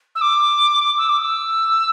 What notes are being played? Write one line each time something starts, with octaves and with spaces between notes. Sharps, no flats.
E6
D6
E6
D6
E6